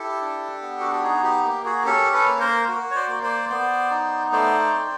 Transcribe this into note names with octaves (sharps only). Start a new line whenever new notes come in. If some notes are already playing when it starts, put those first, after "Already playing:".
Already playing: E4 G4 A4
D4
B3
F#4
G4
D#4 F#4 G#4
G4
A#3 G4
F#4 G#4
C#4 G4 A4
A4 B4
A#3
A#4 C5
F#4
C#5
C5 D5
A#3
C5 D5
B3 C5 D5
D#4
A3 C5 D5
C4